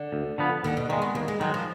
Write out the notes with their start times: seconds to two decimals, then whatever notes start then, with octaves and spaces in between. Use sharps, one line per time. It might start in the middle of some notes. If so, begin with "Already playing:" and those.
Already playing: D3
0.12 D2
0.38 D3 F3 B3
0.64 D#2 D3
0.77 B2
0.89 D#3 G#3 A#3
1.02 B3
1.15 D#2 A#3
1.28 G#3
1.40 D#3 F#3 G#3
1.54 F3